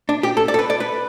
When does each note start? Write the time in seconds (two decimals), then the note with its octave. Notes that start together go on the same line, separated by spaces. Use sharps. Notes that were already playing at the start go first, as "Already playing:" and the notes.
0.09 D4
0.23 G4
0.37 A4
0.48 D5
0.54 A4
0.59 B4
0.70 D5
0.80 B4